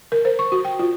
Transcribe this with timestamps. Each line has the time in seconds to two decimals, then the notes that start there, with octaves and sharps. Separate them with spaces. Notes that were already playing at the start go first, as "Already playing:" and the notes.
0.12 A#4
0.25 C5
0.39 C#6
0.52 F#4
0.65 G5
0.79 F4